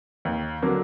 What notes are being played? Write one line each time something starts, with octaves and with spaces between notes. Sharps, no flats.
D#2
D3 F#3 A#3